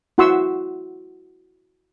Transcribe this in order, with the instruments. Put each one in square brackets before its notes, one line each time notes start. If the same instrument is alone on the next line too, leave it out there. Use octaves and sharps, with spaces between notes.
[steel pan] E4 F#4 F#5 C6 C#6 E6